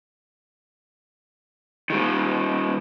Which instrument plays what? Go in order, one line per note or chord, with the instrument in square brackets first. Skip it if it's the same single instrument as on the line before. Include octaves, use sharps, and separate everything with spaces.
[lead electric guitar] D#3 G3